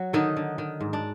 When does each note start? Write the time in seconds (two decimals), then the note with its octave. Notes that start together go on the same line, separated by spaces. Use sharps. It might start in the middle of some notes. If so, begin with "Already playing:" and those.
Already playing: F#3 F#4
0.13 D3 D#3 D#4
0.36 D3
0.58 D#3
0.81 G#2
0.93 D4